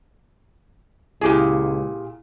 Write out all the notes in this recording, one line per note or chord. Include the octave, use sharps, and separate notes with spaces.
C#2 A#2 E4 G4 G#4